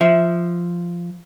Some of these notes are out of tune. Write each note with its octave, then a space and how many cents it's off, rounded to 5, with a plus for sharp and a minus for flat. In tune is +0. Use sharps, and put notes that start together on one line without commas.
F3 -10 E5 +0